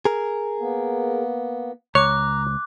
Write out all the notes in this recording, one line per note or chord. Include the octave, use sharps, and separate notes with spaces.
G#4 A#4
A#3 B3
C#2 C#5 A#5 D6 F#6